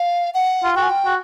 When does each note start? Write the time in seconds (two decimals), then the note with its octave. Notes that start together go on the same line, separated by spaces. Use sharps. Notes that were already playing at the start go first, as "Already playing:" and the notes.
Already playing: F5
0.34 F#5
0.64 F4
0.76 F#4 G5
0.83 G#5
0.90 G5
1.06 F#4